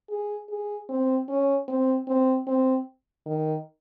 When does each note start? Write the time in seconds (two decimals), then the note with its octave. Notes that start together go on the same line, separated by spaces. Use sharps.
0.10 G#4
0.49 G#4
0.89 C4
1.29 C#4
1.68 C4
2.08 C4
2.47 C4
3.26 D#3